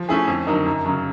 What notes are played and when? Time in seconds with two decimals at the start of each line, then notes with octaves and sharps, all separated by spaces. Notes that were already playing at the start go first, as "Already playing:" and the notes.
Already playing: F3
0.09 A3 C#4 E4 G#4
0.28 F2
0.47 D3 F#3 A#3 D#4
0.66 F#2
0.85 C#3 F#3